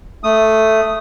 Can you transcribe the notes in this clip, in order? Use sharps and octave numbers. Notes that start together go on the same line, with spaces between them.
A3 D#6